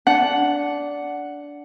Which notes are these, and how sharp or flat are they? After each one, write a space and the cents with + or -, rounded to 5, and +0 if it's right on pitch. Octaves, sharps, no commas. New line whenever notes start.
D4 -15 F#5 +0